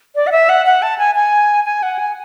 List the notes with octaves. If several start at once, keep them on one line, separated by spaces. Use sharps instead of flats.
D5
F#5
E5
F#5
F#5
A5
G#5
G#5
G#5
F#5
G#5